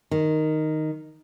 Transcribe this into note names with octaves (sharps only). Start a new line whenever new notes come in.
D#3